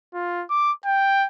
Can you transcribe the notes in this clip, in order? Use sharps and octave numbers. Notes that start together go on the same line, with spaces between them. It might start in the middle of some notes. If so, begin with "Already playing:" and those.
F4
D6
G5